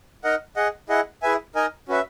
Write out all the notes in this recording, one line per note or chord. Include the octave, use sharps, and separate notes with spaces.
D#4 A#4 D#5 F#5
G#4 D#5 F#5
E4 G#4 D#5 F#5
E4 G#4 B4 E5 G#5
D#4 A#4 D#5 G#5
C#4 F#4 B4 E5